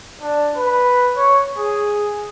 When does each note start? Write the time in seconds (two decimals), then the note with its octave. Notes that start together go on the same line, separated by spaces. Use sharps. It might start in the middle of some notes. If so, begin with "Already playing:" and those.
0.21 D4
0.56 B4
1.17 C#5
1.58 G#4